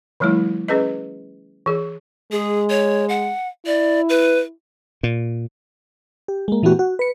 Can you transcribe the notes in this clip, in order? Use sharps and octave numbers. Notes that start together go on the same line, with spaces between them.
D3 F3 G3 A3 E4
C#4 G#4 B4 D#5
E3 G#4
G#3 G#4
C#5
F#5
E4 D5
B4
A#2
G4
G#3 A#3
A#2 E3 A3 B3 F#4 G4
F#4
B4 C#7